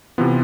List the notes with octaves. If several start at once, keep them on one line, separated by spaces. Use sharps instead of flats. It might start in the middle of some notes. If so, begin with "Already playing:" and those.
C3 E3 B3 F4